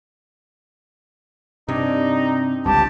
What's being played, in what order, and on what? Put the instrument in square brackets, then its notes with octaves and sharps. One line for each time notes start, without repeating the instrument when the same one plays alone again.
[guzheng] G2 [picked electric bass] C3 [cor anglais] D#4
[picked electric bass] G1 C#2 G2 [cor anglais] G4 [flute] A5